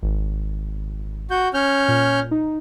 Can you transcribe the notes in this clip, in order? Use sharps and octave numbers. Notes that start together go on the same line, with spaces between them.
G#1
F#4 G6
C#4 F6 G6
A#2
D#4